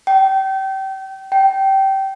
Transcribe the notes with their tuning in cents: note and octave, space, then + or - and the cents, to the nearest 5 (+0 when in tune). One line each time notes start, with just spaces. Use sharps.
G5 -30
G5 -20